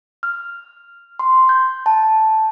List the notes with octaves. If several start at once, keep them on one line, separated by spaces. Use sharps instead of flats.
F6
C6
G6
A5